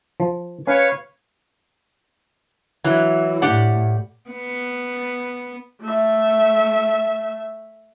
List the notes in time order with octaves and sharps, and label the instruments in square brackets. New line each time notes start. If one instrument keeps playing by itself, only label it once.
[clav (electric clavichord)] F3
[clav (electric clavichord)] C#4 [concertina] B4 F5 [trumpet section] C#5
[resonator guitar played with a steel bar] E3 F#3
[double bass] A2 [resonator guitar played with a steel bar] G4 D5 F#5
[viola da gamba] B3
[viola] A3 E5